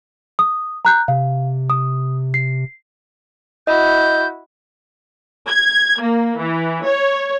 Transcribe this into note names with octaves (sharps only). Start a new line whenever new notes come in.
D#6
A#5 F#6 G6
C3 F5
D#6
C7
E4 F#4 D#5 G6
G#6
A#3
E3
C#5